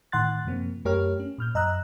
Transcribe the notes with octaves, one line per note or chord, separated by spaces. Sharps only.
A2 D#3 F#5 C6 F#6 A6
F#2 C3 F3 A#3 C4
F#2 A3 G4 A#4 C#5 F6
C#4
A#2 F6 G6
F#2 D#5 A#5 E6 F#6